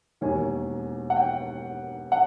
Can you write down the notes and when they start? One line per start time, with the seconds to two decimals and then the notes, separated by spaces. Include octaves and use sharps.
0.21 E1 D#2 D#3 G#5
1.10 F#5
1.16 G5
2.12 F#5